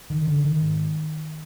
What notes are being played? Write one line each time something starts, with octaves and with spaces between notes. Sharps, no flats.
D#3
D3
D#3
G#2